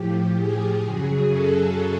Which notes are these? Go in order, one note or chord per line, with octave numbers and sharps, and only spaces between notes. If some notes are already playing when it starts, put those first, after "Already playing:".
Already playing: A2 F3 G4
G#4
F#2 C#3 F#3
A4